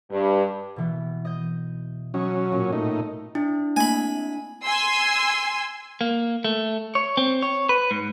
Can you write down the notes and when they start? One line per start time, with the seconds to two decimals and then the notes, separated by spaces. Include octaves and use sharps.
0.12 G2
0.76 B2 E3 B3
1.25 D#5 G6
2.14 F#3 C#4 D#5 C#6
2.52 A#2
2.72 A2 D#4
3.35 D4 E4
3.76 A3 A#3 C4 G#5 B5
4.64 G#5 C6 E6
6.01 A#3
6.44 A3
6.95 C#5
7.17 C4
7.43 C#5
7.69 B4
7.91 G#2